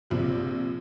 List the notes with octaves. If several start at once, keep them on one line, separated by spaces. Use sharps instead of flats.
A#1 C3 F3